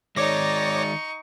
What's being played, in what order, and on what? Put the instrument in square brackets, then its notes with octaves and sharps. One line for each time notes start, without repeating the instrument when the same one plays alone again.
[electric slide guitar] D#3 G#3 [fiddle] D#4 C#6 [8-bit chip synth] C#5 D6 A#6 [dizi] D5